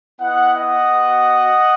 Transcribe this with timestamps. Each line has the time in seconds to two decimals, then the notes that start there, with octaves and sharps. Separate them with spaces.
0.20 B3 E4 D#5 F#5
0.54 D#5 F#5
0.88 B3 F#4